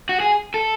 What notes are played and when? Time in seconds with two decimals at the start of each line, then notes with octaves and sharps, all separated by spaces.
0.09 F#4
0.20 G#4
0.54 A4